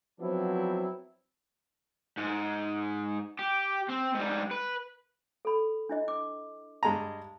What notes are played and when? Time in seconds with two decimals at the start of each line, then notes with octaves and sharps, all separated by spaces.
0.20 F3 F#3 B3 C4 D4 E4
2.18 G#2
3.39 G4
3.89 C4
4.15 G#2 G3
4.51 B4
5.45 A4 B5
5.89 D4 E4 D#5
6.08 D6
6.83 G2 G#3 A5 A#5